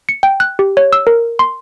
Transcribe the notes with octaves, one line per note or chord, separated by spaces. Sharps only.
C#7
G5
F#6
G4
C#5
E6
A#4
C6